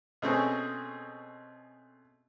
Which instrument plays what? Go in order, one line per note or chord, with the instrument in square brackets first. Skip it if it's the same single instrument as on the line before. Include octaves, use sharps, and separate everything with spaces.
[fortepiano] B2 A3 C4 C#4 G#4